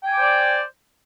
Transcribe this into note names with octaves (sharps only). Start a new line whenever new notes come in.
C5 D5 G5 G#5 D6